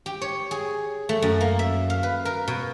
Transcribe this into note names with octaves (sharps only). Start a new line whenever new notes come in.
G4
C#5
G#4
A3
F#2
A#3
E5
F5
B4
A#4
B2